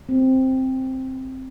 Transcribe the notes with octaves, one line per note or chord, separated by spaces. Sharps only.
C4